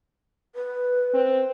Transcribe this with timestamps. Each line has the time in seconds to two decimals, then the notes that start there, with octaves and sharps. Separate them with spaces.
0.55 B4
1.14 C4